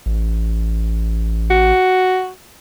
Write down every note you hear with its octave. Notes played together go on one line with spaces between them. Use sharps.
A1
F#4